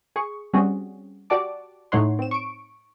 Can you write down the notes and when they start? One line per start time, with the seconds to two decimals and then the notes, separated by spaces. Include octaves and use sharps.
0.16 G#4 C#6
0.53 G3 C4 C#4 F#4 G#4
1.30 F#4 G4 D5 F#5 A5 D6
1.92 A2 A3 D#4 C#5 F#5 C6
2.19 C4 E7
2.31 C#6 D7